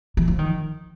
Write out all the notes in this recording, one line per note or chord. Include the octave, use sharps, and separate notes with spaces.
E3
F3
D#3